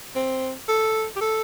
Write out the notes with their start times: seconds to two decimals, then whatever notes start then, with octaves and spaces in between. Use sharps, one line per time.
0.15 C4
0.68 A4
1.16 G4
1.21 A4